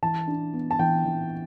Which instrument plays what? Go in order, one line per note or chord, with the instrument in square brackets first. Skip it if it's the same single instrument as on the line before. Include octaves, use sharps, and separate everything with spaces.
[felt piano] E3 [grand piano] A5
[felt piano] D4
B3
[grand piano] A5
[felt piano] E3 [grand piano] G5
[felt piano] E3